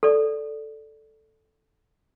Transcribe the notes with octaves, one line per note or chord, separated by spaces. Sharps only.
A4 D5